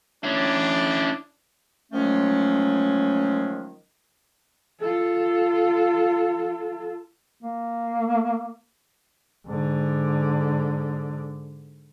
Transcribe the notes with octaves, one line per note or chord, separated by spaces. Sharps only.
C#4 D4 E4
D#3 F3 F#3 G#3 A3 C#4
F4 A4
A#3
G#2 D3